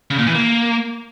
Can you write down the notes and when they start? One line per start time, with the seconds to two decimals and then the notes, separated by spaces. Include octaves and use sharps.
0.11 C#3
0.19 A#2
0.27 E3
0.35 A#3